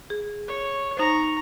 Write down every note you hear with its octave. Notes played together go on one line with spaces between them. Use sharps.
G#4
C#5
D#4 C5 A#5 C#6